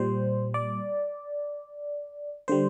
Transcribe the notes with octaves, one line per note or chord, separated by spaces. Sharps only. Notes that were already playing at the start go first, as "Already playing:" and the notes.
Already playing: A#2 G3 C5
D5
D3 G3 C5